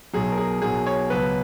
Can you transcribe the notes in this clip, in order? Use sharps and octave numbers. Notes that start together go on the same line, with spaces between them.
B1 B2 F#3 G#4
A#4
G#4
B1 B2 F#3 G#4
C#5
C#2 B2 F#3 B4